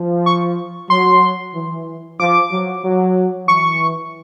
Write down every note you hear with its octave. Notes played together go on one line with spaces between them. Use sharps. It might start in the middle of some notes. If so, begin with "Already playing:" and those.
Already playing: F3
C#6
F#3 C6
E3
F3 D6
F#3
F#3
E3 C#6